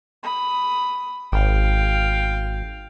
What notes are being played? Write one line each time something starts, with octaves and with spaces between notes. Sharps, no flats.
B5 D#6
G#1 F5 G5